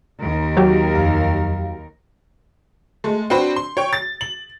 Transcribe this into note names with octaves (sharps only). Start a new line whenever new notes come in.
D#2 A#4
F#3 G4
F2 F5
G#3 A3
C4 D4 F#4 B4 C5
C6
C#5 G5
A6
F#7